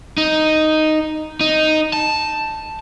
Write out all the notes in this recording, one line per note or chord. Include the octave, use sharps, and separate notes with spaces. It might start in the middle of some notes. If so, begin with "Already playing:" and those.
D#4
D#4
A5